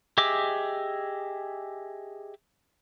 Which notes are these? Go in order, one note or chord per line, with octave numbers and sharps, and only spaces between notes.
G4 G#4 D#5 E5 D6